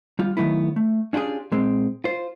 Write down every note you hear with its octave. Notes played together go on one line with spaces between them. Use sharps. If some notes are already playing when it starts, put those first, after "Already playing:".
G3 F4
D#3 E3 F#3 A3 B3 E4
A3
C#4 D4 F4 G4 G#4
A#2 G#3 C4
F4 C5